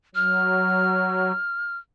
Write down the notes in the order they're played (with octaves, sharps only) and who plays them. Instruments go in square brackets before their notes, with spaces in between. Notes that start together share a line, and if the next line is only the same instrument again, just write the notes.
[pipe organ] F#3 [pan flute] F6